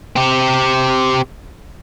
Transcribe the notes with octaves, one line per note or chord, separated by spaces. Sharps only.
C4 G4